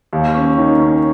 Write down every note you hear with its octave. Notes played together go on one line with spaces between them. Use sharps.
D#2
C#4
D#3
C#4